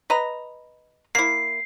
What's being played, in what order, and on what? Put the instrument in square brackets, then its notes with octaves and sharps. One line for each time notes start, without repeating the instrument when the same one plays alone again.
[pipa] B4 D#5 A#5
[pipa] A#3 E4 [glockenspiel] C7